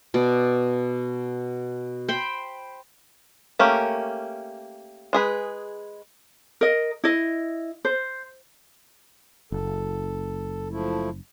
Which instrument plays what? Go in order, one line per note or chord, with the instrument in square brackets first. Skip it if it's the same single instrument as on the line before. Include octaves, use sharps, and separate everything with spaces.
[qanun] B2 D5
C5 G5 B5
[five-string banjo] A3 A#3 C#4 G4
G#3 G#4 B4
[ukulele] A#4 D#5
E4 D#5
C5
[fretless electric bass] F#1 [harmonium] A4
[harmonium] F3 A3 E4